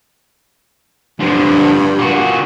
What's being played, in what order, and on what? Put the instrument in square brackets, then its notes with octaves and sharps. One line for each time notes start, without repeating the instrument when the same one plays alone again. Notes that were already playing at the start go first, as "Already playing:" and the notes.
[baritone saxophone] G2 [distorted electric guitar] D3 F3
[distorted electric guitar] A#2 F#4